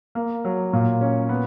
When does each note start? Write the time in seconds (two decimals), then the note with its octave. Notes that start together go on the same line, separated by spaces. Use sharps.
0.15 A#3
0.45 F#3
0.73 A#2
1.01 C#4
1.29 B3